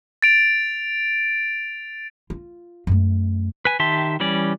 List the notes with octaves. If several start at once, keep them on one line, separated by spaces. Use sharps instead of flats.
A6 D7 F7
F4
F#2 A3
B4 G#5
D#3 G4 E5 A5 C6
E3 G3 C#4 D5